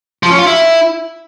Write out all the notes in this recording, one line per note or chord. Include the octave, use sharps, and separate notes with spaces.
F3
C#4
F4
E4